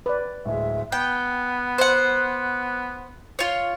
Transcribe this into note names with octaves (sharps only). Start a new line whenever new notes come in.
B4 D5
D1 G#3 E5
B3 G5
C5 F#5
F4 C#5